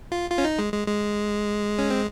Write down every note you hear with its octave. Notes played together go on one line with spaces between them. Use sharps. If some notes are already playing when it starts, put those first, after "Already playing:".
F4
F4
C#4
D#4
G#3
G#3
G#3
C#4
C4